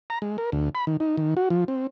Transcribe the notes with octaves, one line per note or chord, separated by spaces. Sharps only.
A#5
G#3
A#4
D2
B5
D#3
D#4
D#3
F#4
F3
C4